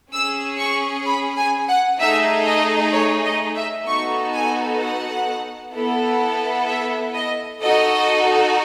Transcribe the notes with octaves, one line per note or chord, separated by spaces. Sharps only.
C#4 G#4 E6
C#6
B5
G#5
F#5
A3 D#4 G#4 E5
D#5
C#5
D#5
E5
B3 D#4 F#4 A4 C#6
G#5
F#5
B3 E4 A4
E5
D#5
D#4 F#4 A4 D#5